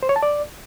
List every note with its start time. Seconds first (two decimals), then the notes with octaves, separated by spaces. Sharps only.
0.03 C5
0.09 C#5
0.16 A5
0.23 D5